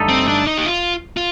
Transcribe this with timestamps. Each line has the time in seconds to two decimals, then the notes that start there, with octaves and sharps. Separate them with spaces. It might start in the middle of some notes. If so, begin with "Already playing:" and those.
Already playing: G2 D3 A3 D#4 A4
0.09 C4
0.28 D4
0.47 D#4
0.57 G4
0.66 F4
1.17 F4